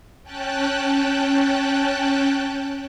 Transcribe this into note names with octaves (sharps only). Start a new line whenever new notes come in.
C#4 G5 A5 F#6